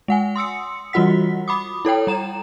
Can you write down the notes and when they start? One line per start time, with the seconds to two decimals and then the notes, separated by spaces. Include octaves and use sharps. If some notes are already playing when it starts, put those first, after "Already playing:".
0.08 G#3 F#5 G#5
0.36 C6 D#6 E6 C#7
0.93 E3 G3 F4 F#4 F#5 B6
1.48 B5 D6 D#6
1.85 E4 A4 C#5 G5
2.07 G3 A#5 E7